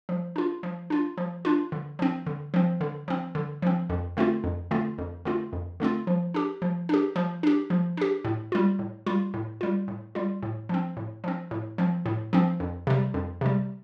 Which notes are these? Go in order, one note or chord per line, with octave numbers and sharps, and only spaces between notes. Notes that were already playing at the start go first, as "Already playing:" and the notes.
F3
D4 F4
F3
D4 F4
F3
D4 F4
D3
F3 C4
D3
F3 C4
D3
F3 C4
D3
F3 C4
F2
D3 A3 C4 F4
F2
D3 A3 C4 F4
F2
D3 A3 C4 F4
F2
D3 A3 C4 F4
F3
D4 G4
F3
D4 G4
F3
D4 G4
F3
D4 G4
A2
G3 F4
A2
G3 F4
A2
G3 F4
A2
G3 F4
A2
F3 C4
A2
F3 C4
A2
F3 C4
A2
F3 C4
F2
C3 G3
F2
C3 G3